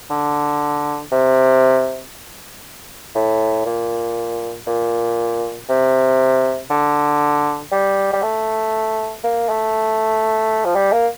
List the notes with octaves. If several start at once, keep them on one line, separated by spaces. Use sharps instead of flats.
D3
C3
A2
A#2
A#2
C3
D3
G3
G3
A3
A#3
A3
F3
G3
A#3